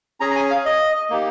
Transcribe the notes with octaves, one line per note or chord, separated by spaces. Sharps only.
C#4 G#4 A#5
A#5
G#5
F5
D#5
A#3 D#4 G4